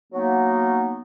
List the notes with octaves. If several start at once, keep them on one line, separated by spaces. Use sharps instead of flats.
F#3 A#3 B3 D#4